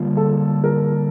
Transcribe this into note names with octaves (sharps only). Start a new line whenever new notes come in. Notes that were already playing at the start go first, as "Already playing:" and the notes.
Already playing: D3 G3 A#3 F4
A4
A#4